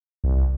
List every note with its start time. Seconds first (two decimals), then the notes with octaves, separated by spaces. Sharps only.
0.24 C2